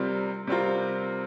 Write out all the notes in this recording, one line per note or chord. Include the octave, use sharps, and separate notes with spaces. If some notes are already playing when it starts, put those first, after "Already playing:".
Already playing: C3 G3 C4 F4 A#4
C3 G3 C4 F4 A#4